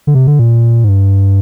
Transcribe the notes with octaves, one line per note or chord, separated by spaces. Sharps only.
D3
C3
D3
A#2
G#2
G2